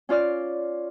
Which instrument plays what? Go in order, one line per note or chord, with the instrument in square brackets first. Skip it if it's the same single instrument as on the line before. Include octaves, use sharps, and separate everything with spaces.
[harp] C#4 F4 D5 F6